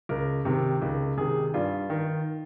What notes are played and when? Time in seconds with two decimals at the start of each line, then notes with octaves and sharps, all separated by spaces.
0.09 C#2 A#4
0.45 C3 D#3
0.82 C#2 A#4
1.17 C3 D#3 G#4
1.54 G2 F4
1.90 D#3